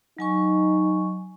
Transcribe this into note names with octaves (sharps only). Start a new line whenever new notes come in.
F#3 D#4 G#5 C#6